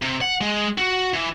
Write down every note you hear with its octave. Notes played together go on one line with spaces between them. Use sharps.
C3
F#5
G#3
F#4
E3